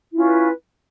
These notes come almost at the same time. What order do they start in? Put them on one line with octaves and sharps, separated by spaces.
E4 F4 C#4 B4